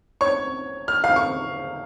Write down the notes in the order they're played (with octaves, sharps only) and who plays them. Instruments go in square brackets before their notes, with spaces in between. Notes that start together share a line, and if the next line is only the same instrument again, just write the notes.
[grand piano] C#5 C#6
F6
F5 F6
C#6